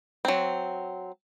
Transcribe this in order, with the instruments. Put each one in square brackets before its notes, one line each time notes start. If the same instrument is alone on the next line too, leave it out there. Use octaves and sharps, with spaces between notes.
[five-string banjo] F#3 C4